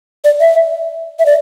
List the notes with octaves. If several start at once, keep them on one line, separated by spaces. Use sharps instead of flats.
D5
E5
E5
D5